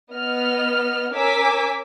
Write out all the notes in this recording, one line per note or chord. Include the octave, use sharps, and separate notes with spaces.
B3 D#5 F6
C#4 A#4 G#5 D6 E6 B6